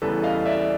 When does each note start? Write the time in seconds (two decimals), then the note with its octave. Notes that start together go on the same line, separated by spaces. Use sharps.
0.02 E2 C#3 E3 G3 A4 B4
0.24 D#5 F5
0.46 D5 E5